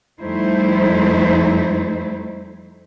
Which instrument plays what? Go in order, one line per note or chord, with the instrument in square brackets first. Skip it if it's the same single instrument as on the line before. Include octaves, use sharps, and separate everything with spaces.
[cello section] F2 G3 A3 D#4 E4 C5